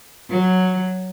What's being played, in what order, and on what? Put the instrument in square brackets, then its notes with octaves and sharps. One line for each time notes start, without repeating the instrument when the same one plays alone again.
[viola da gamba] F#3